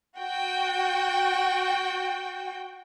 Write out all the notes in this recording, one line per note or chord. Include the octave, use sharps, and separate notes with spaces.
F#4 G5